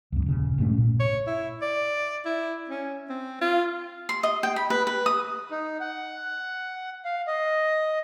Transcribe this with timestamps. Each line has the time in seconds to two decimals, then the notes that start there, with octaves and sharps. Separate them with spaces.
0.12 C#2 F#2
0.26 D#1 C#3
0.58 A#1 G2 A3 C#4
0.78 A#2
1.00 C#5
1.27 E4
1.62 D5
2.25 E4
2.70 C#4
3.09 C4
3.41 F4
4.09 C6
4.23 D#5
4.43 G5
4.56 B5
4.70 B4
4.87 B4
5.06 D#6
5.51 D#4
5.80 F#5
7.05 F5
7.27 D#5